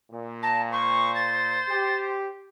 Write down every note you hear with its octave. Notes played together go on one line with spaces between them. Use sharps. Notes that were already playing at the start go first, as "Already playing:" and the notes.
A#2
A5 A#5
C5 C#6
A6
G4